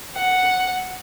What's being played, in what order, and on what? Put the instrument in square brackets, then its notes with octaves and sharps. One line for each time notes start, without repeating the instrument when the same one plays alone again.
[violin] F#5